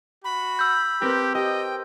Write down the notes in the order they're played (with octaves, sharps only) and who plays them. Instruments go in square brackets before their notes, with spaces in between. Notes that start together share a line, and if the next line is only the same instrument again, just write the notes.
[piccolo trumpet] F#4 [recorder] B5
[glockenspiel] E6 G6
[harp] C4 A#4 B4 [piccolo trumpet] G4
[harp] G4 [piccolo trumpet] D#5 [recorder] G5